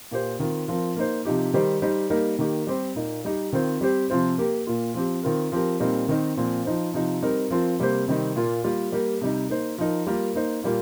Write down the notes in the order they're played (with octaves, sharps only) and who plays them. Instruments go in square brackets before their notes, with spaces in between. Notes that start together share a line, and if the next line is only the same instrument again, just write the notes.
[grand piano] A#2 A#3 G4 C5
D#3 C4 F4
F3 C4 F4 A#4
A#3 D#4 C5
C3 F3 D#4 G4
D#3 G3 D#4 G4 C5
G3 D#4 G4 C5
G3 A#3 D#4 A#4
D#3 A#3 D#4 G4
G3 C4 G4 C5
A#2 A#3 D#4
G3 D#4 G4
D#3 C4 F4 C5
G3 C4 G4 C5
C3 F3 C4 F4 C5
A#3 G4 A#4
A#2 A#3 F4
F3 C4 G4
D#3 C4 F4 A#4
F3 C4 G4 A#4
A#2 G3 C4 D#4 A#4
D#3 C4 D#4 A#4
A#2 F3 C4
F3 D#4 C5
C3 F3 D#4
G3 C4 D#4 A#4
F3 C4 F4 A#4
C3 G3 A#3 G4 C5
C3 D#3 G3 C4 D#4
A#2 A#3 F4
G3 A#3 F4 A#4
G3 A#3 G4 A#4
C3 G3 D#4
A#3 D#4 C5
F3 D#4 A#4
G3 A#3 F4 A#4
A#3 D#4 C5
A#2 G3 A#3 F4